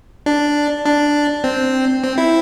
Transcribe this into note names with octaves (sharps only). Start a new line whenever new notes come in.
D4
D4
C4
C4
E4